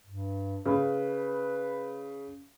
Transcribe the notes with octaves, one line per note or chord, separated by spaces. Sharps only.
G2
C#3 B4